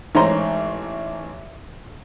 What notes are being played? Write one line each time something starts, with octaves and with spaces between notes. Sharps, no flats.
A1 G#2 C5 C#5 A#5 C6